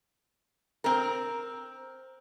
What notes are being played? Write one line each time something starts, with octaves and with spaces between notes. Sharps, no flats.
C4 A#4